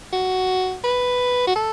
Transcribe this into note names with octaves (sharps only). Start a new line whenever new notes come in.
F#4
B4
F#4
A4